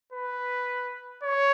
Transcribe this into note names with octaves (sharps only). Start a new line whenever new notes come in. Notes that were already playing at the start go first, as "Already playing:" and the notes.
B4
C#5